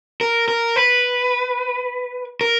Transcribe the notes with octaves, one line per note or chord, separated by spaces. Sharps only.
A#4
A#4
B4
A#4